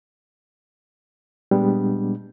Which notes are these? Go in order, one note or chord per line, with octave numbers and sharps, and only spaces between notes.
A#2 G3 G#3 B3 D4